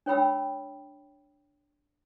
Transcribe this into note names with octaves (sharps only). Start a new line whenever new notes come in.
D4 C#5 G5 B5 E6